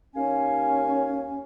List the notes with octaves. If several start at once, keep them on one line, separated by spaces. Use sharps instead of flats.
D#2 C#4 F5 G#5